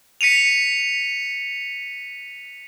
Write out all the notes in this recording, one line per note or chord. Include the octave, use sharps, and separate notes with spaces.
B6 C#7 D#7 F7